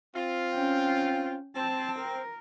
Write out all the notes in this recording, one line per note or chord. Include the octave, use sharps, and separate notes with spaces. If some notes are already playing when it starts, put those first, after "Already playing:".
C4 F4
C#4 G5
C4 A5
A#4